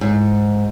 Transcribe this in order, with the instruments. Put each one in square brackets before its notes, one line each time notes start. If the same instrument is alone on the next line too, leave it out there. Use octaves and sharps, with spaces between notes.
[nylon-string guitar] G#2